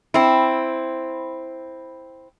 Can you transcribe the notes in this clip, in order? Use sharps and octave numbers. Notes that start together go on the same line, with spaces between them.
C4 E4